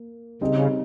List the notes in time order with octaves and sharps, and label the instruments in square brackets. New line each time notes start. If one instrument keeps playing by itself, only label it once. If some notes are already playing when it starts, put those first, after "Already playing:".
Already playing: [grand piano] A#3
[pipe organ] C#3 [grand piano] G3 C4 D#4 G#4 D#5